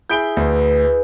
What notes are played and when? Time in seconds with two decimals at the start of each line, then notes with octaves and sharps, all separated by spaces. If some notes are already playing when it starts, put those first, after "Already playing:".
0.10 E4 G#4 B5 G6 D7 G7
0.37 D2 B4